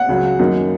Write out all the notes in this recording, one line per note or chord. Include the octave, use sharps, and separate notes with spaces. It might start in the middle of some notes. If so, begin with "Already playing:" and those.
Already playing: F#5
C#2 C#3 F#3
F#2 D#3 A#3 D#4